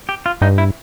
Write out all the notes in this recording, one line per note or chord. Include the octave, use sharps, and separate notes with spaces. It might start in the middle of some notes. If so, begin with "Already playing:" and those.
G4
F4
G2 D#4
E4